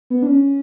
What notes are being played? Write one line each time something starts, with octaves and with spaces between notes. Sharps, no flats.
B3
D4
C#4